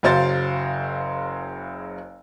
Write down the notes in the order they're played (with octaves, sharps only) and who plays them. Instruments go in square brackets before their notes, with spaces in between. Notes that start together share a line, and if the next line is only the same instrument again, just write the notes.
[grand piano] F#1 C#3 F#3 C5 F5 A6